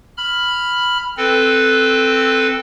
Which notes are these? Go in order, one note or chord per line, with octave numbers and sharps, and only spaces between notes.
B5 F6
C4 A4 B4